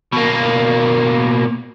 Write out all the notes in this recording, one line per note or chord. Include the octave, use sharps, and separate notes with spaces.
B2 A#3